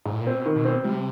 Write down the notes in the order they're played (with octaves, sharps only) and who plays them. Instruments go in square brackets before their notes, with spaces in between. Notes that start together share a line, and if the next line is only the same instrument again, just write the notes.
[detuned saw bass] G#2
A2
A#2
[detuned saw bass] B2 [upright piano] C4
[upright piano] D#3
[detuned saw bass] B2
[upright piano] C4
[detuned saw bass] C3 [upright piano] G3